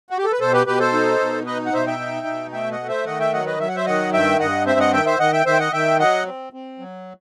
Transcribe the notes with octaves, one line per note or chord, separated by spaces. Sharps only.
F#4
G4
A4
B4
B2 A4 C5
G4 B4
B2 G4 B4
A4 C5
D#4
B2
D#4 B4 D#5
F#5
B2 C5 E5
E5 G5
D#4
B2
A3 E5 G5
D#5 F#5
A3
C5 E5
D#3 D#5 F#5
E5 G5
F#3 D#5 F#5
B4 D#5
F#3 E5
F#5
C5 E5
D#3 D#5 F#5
G2 E5 G5
G2 D#5 F#5
C4 C5 E5
D#5 F#5
D#3 E5 G5
C5 E5
D#3 D#5 F#5
E5 G5
D#3 C5 E5
G5
D#5 F#5
D#3 E5 G5
F#3 D#5 F#5
C4
C4
F#3